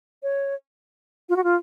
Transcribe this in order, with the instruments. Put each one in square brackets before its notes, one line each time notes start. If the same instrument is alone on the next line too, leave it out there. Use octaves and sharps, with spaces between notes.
[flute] C#5
F4
F#4
F4